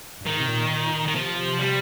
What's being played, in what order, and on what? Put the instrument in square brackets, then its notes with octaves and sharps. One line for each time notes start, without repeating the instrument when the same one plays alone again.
[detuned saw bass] G2
[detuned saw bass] G#2 [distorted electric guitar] D#3
[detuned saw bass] C3
A#2
A#2
[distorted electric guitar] D#3
[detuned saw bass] C3 [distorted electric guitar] F3
[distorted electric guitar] G3